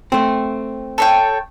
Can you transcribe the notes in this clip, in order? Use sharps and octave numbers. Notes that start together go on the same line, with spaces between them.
A3 C4
A4 C#5 G5